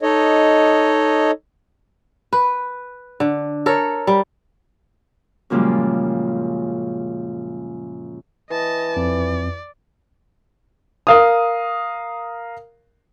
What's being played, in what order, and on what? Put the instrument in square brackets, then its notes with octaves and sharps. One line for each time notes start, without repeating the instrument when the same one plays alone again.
[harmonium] D#4 A4 C#5 D#5
[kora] B4
D3
A4 A#4 C#5
G3
[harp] F#2 A#2 C#3 F3 G3 G#3
[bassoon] E3 [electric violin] D#5 A5
[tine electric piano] F2 [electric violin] D5
[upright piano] A#4 F5 D#6